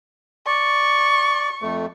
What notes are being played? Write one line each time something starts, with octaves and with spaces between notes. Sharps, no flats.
D5 C#6
F2 A3